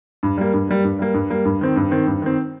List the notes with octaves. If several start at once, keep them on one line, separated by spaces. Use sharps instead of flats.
G2
G3 A#3
G2
G3 A#3
G2
G3 A#3
G2
G3 A#3
G2
D#3 C4
G2
D#3 C4
G2
D#3 C4